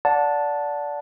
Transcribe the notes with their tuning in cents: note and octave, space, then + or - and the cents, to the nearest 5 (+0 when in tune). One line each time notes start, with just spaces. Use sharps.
D5 -15 F#5 -25 A5 +0